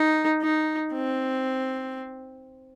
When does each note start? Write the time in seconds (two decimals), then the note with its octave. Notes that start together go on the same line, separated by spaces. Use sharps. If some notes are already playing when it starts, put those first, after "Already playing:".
Already playing: D#4
0.42 D#4
0.93 C4